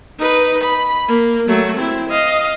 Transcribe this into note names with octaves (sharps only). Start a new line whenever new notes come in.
D#4 B4
B5
A#3
F#3 A3
C4 E4
D#5 F5